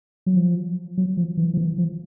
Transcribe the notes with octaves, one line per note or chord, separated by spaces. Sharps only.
F#3
F3
F#3
F3
E3
F3
E3
F3